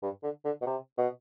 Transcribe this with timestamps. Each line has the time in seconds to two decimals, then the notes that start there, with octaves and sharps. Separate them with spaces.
0.03 G2
0.23 D3
0.45 D3
0.62 B2
0.67 C3
0.98 B2